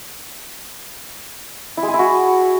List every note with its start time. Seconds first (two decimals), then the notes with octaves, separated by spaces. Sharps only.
1.77 E4
1.83 G#3
1.88 G#4
1.94 E4
1.99 F#4